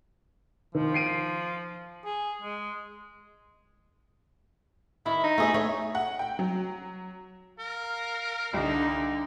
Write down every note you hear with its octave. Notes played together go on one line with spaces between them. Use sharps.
D#3 F3
C7 D7 D#7
G#4
G#3
D#3 E4
D#4
A3 G#4 E5
A3 C#5
F#5
G5
F#3
A#4 F5
C2 D3 D#4